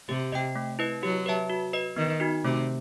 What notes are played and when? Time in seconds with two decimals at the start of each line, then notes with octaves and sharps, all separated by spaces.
0.09 C3 G4
0.32 D#5 G5
0.55 A3
0.79 E4 B4 D#5
1.03 F#3 G4
1.26 B4 E5 A5
1.50 F#4
1.73 B4 D#5
1.96 D#3 B3
2.20 D#4 F#4
2.44 C3 A3